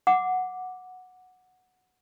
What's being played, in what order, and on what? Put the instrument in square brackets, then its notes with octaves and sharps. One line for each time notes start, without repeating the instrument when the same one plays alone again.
[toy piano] F#5 D6